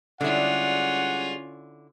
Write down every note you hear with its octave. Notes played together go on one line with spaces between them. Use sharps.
D3 G3 G#3 C#4 E4 F4 F#5